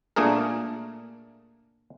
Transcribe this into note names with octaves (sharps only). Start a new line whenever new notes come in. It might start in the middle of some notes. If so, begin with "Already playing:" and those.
A#2 A3 D4 G#4 A#4